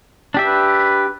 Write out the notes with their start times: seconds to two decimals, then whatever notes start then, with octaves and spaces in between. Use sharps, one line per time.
0.34 D4 G4 E5
0.46 B4